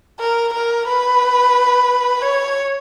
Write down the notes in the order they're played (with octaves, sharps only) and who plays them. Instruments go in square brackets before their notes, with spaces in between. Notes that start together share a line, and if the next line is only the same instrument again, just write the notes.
[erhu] A#4
A#4
B4
C#5